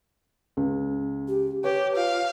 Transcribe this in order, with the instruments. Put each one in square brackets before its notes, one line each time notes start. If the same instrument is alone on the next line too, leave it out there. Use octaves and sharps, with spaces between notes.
[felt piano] C#2
[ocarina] G4
[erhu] G4 [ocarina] B4 [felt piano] C#5
[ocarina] F4 [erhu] F5